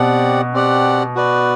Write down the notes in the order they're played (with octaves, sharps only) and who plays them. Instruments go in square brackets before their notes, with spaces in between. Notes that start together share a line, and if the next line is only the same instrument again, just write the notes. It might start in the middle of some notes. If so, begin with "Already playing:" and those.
Already playing: [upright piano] B2 [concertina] C4 G4 D5 F#5
[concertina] C4 G4 D5 F#5
F#4 B4 D5